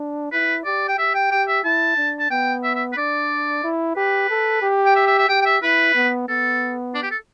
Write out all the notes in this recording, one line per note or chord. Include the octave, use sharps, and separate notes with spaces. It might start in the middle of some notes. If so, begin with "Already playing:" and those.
Already playing: D4
E4 B4
G4 D5
G5
G4 E5
G5
G4 G5
E5
E4 A5
D4
A5
B3 G5
E5
E5
B4
D4 D5
E4
G4 B4
A4
G4
G5
E5
E5
E5
G4 G5
G5
E5
E4 B4
B3
B3 A4
D4
G4
A4